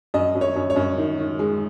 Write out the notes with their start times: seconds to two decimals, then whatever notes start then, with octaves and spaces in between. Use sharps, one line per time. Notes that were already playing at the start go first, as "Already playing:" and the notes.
0.14 F#2 D#5
0.35 F#2
0.41 C#5
0.56 F#2
0.70 C#5
0.76 F#2
0.98 D#3
1.19 D#3
1.39 G#3